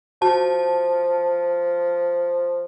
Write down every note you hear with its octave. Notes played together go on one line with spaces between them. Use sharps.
F3 F#4 A5